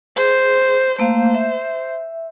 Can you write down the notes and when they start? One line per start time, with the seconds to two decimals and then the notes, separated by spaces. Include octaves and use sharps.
0.17 G#4 C5
0.98 A3 A#3 C5 F5
1.35 E5